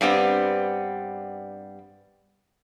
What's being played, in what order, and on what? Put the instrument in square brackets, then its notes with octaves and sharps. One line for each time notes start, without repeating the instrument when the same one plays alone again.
[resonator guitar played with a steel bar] G2 G3 B3 C4